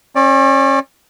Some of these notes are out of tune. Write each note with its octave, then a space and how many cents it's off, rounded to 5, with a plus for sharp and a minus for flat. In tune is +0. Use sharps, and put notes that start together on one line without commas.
C#4 -35 D5 +0